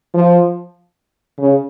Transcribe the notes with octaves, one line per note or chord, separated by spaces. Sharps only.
F3
C#3